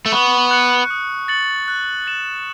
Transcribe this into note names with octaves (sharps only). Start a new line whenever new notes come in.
A3
B3 C#6
F#6 C#7
D#6
A6 C#7 F#7
F#6
A6 E7